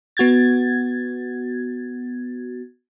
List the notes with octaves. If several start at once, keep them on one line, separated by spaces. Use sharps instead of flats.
B3 F#4 G#6 A6